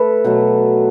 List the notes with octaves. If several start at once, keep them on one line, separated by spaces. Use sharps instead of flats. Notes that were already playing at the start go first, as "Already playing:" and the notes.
Already playing: A3 A4 B4
B2 F#3 A3